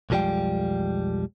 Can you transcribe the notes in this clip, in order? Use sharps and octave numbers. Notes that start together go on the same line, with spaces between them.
B1 F2 F3 G3 G#3 G5